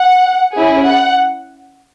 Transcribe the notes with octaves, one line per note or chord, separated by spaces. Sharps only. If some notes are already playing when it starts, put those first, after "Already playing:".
Already playing: F#5
C#4 E4 G#4
F#5